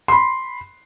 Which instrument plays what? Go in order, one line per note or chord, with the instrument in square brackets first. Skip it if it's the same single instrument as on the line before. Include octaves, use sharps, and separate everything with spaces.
[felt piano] B5 C6